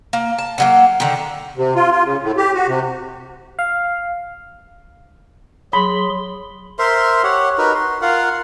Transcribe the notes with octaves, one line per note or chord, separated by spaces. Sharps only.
A#3
A5
D3 F#3 A#3
D3 D#3
C3
F4
F4
C#3
A2
G4
F#4
C3
F5
F#3 G#4 B5 C6
A#4 C5 E5 C6
G4 C#5 F#5
D#4 F#4 A#4 B4
C6
F4 A#4 F5 F#5